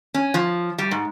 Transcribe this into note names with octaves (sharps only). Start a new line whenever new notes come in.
C#4
F3
G3
G#2